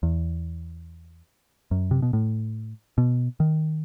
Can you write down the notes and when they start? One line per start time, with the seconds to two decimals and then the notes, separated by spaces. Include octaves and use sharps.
0.03 E2
1.71 F#2
1.91 C3
2.02 B2
2.13 A2
2.98 B2
3.40 D#3